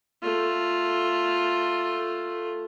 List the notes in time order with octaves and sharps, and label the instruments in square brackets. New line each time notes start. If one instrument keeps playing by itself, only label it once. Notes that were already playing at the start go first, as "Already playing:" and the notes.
[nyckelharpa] A3 F4